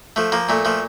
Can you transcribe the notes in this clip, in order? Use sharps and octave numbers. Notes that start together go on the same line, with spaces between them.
F3 A3
F3 A#3
A#2 A3
F3 A3